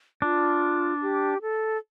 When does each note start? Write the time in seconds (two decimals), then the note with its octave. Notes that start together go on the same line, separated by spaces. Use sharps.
0.22 D4 F4
1.02 G4
1.42 A4